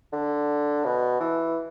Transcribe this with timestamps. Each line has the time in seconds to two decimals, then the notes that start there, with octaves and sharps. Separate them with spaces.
0.13 D3
0.85 B2
1.20 E3